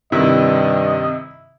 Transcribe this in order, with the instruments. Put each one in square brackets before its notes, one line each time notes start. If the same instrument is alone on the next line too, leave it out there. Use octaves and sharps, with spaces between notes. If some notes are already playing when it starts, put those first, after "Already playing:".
[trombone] G2 [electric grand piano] C3 D#3 [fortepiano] E4 [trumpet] D#5